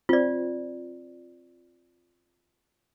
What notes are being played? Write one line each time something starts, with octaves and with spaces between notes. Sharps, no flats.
C4 F4 D5